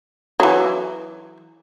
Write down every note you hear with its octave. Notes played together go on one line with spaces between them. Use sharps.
E3 F#3